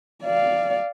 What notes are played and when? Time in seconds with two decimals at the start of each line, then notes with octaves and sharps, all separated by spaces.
0.25 D5 F5